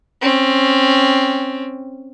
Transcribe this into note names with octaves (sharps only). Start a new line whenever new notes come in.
C4 C#4